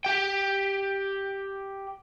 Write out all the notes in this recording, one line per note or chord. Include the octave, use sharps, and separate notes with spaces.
G4 G5